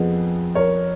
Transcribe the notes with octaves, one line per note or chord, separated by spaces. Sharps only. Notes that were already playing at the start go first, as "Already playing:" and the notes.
Already playing: F2 F3 B3 G#4
A#4 C#5